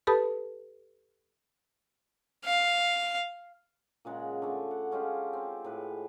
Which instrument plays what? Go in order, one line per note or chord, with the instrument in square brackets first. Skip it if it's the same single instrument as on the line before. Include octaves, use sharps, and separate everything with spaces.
[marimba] G4 A4 B4 A5 B5 D#6
[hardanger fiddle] F5
[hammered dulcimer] A#2 C#3 G#3 F#5
D3 A3
F#5
G#3 C#4 F4 G4
C4
A2 G#3 B4